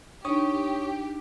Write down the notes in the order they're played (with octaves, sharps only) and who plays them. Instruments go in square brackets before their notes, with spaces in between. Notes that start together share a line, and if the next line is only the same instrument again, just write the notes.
[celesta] D4 D#4 [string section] G4 [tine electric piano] C#5 C#6 D#6